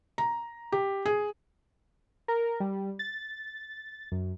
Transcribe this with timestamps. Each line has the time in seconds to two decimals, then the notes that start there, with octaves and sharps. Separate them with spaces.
0.18 A#5
0.72 G4
1.06 G#4
2.28 A#4
2.60 G3
2.99 A6
4.12 F#2